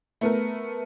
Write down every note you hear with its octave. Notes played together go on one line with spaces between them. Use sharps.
A3 B3 A#4